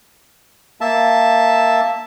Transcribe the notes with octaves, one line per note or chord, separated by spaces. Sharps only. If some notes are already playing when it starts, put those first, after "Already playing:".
A#3 E5 A5